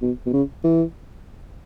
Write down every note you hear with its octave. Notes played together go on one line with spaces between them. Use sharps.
B2
B2
C#3
E3